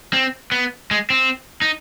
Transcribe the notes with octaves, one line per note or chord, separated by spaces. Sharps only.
C4
B3
G#3
C4
D#4